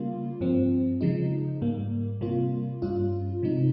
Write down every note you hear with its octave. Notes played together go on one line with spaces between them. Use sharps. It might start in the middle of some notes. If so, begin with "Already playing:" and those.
Already playing: C#3 G3 A#3 F4
G2 F3 C4
C#3 F3 G#3 D#4
G#2 G3 A#3
C3 G3 A#3 F4
G2 G3 C#4 F4
C3 F3 G#3 D#4